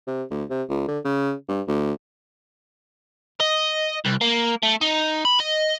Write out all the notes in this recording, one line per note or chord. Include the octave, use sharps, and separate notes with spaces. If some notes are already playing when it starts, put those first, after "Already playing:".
C3
D2
C3
C#2
D3
C#3
G2
D2
D#5
C2
A#3
A3
D#4
B5
D#5